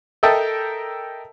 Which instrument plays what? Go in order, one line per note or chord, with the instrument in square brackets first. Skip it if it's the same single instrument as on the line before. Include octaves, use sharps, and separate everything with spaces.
[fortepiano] A4 A#4 D#5 E5 G5 A5